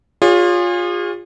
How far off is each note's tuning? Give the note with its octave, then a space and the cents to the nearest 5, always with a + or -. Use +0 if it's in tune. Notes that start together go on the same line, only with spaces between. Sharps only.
F4 +20 G#4 -35 C#5 +30